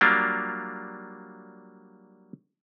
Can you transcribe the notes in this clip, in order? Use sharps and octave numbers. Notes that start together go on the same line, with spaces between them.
F#3 G3 A#3 D4 F4